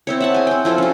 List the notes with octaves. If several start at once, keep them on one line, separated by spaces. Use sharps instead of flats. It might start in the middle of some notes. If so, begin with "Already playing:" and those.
C4 E4 C#5
E5 F#5 A5
G#4 G#5
C4 G5
F3 E4 F4 A4
C#4 F#4